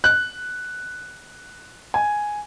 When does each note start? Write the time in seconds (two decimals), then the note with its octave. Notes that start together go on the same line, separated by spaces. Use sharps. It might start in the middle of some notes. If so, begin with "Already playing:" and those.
0.04 F#6
1.94 G#5